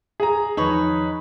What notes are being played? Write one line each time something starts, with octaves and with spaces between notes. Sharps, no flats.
G#4 A#5
E2 D#3 F3 D#4 B4 C#5